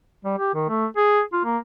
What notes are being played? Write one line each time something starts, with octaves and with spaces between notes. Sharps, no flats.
G3
G4
D#3
A3
G#4
F4
A#3